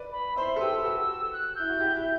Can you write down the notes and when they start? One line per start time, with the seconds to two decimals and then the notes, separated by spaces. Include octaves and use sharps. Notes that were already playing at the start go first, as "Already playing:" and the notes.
Already playing: B4 D5
0.12 B5
0.36 C5 E5 C6
0.56 A4
0.60 G4 B4 E6
0.84 F#4 A4
1.33 F#6
1.55 E4 G6
1.70 F#4
1.80 E4 G4
1.96 E4